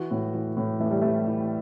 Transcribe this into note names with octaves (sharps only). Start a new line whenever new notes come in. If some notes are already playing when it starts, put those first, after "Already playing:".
Already playing: E3 F#4
A2
E3
A2
E3 A3
G3
A2 A3
E3